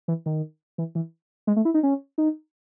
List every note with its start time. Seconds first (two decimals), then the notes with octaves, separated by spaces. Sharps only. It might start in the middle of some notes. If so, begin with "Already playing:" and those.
0.08 E3
0.26 D#3
0.78 E3
0.95 E3
1.47 G#3
1.56 A3
1.65 E4
1.74 D#4
1.83 C#4
2.18 D#4